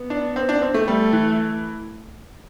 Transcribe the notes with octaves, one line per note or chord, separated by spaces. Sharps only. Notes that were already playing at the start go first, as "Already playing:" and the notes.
Already playing: B3
D4
C4
D4
C4
A3
G3 A3
E3